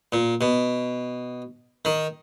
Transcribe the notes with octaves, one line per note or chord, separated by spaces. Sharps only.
A#2
B2
D#3